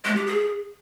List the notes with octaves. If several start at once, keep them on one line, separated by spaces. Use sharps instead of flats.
G#3
G4
G#4